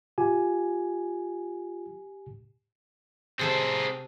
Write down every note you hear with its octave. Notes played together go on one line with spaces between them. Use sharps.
F4 G4 G#5
C3 C4 G#4 A4 C5